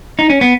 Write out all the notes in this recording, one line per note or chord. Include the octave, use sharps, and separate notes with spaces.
D#4
C#4
B3